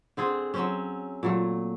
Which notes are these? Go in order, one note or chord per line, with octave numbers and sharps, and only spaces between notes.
D3 C4 G#4
F#3 C4 C#4
A#2 F#3 A3